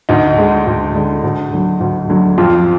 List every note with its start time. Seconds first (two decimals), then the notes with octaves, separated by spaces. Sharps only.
0.09 D2 D#4
0.38 D3 G#3
0.67 D2
0.94 D3 G#3
1.24 D2
1.53 D3 F#3
1.80 D2
2.09 D3 F#3
2.38 F2 F4